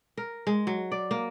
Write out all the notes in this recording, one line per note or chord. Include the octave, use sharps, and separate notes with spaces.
A#4
G#3
F#3
D5
A#3